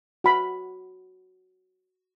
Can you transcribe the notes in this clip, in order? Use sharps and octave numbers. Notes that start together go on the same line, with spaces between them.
F#4 B5